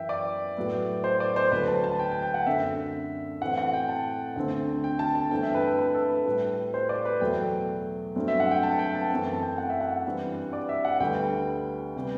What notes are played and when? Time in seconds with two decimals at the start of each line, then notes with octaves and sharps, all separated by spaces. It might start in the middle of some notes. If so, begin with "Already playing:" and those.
Already playing: F#2 E3 B3 E5 G5
0.09 D5
0.57 A2 F#3 B3
1.04 C5
1.20 D5
1.36 C5
1.52 D2 D3 F#3 B4
1.68 A5
1.84 A5
1.99 G5
2.12 G5
2.23 G5
2.34 F#5
2.46 F#2 D3 A3 C4 E5
3.41 A2 E3 A3 C4 F#5
3.57 F#5
3.74 G5
3.89 A5
4.36 D2 D3 A3 C4
4.84 G5
4.99 A5
5.15 A5
5.31 G2 E3 A3 C4 G5
5.43 E5
5.55 B4
5.67 A4
5.79 B4
5.94 A4
6.10 B4
6.26 A2 G3 B3
6.74 C5
6.89 D5
7.05 B4
7.21 E2 B2 F#3 A3 G5
8.16 G2 F#3 A3 C4
8.28 E5
8.40 F#5
8.51 G5
8.63 A5
8.79 G5
8.95 A5
9.11 F#2 E3 A3 C4
9.27 A5
9.43 G5
9.58 F#5
9.70 E5
9.80 F#5
10.06 G2 E3 G3 C4
10.53 D5
10.69 E5
10.85 F#5
11.00 D2 D3 G3 B3 G5
11.96 C3 G3 B3